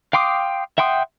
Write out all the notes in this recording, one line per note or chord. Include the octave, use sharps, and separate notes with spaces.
F5 G5 C6 D6 D#6
E5 F#5 G5 C6 D#6